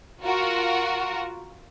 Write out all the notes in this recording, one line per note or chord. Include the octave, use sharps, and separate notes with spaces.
F4 F#4 A#4